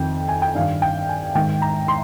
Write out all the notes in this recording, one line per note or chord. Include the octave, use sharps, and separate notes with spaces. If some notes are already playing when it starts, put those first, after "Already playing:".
Already playing: F2 D#3 G5
G#5
G5
G2 D#3 F5
G5
G#5
G#2 D#3 G5
A#5
C6